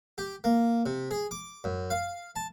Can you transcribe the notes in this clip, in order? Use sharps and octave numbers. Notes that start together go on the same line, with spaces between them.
G4
A#3
C3
G#4
D6
F#2
F5
A5